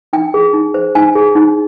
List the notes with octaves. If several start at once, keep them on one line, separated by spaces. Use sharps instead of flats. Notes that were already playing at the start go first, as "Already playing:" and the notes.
D#4 G5
G#4
D#4
C5
D#4 G#5
G#4
D#4